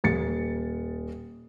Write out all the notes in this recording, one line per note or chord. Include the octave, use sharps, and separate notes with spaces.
D#1 A6 C#7